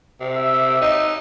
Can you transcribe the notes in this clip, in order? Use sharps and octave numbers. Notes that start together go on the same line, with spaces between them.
C3
E5
D#4